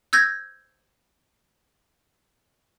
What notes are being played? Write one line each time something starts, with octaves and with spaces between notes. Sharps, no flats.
E6 G6 G#6 A#6